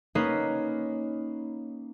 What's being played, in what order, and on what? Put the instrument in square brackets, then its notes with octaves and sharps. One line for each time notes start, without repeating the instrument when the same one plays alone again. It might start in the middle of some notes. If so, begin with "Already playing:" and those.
[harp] A#3 C#4 D#4 A#4 B4 C7